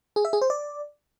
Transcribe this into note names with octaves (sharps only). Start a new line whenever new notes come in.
G#4
E5
G#4
C5
D5